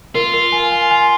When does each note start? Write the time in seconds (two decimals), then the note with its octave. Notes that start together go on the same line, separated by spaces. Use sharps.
0.15 F4 A#4
0.34 A#4
0.52 G#5
0.72 G#5
0.91 G#5